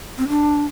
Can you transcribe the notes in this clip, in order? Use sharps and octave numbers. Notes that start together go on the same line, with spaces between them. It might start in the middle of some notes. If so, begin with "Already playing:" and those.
C4
D4